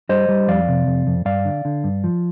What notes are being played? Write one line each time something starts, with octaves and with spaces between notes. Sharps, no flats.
G3 C5 D#5
G3
F2 D5 F5
C3
F2
F2
G2 D5 F5
D3
D3
G2
F3